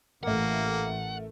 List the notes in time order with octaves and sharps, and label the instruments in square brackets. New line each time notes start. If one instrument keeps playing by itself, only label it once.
[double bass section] A1 [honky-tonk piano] A3 A#4 [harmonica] A#3 [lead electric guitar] F#5